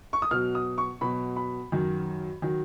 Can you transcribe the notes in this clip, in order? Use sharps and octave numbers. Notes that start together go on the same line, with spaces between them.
C#6
D#6
B2 F#3 F6
D#6
C#6
B2 F#3 B5
B5
F#2 D#3 F#3
D#3 F#3